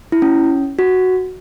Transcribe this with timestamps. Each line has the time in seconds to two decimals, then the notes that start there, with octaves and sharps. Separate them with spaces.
0.12 E4
0.22 C#4
0.79 F#4